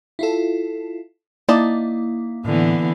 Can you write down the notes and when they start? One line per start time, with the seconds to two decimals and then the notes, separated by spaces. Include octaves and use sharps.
0.19 E4 F4 A4
1.49 A#3 D#4 E4 D5 A5
2.45 A2 D3 E3 B3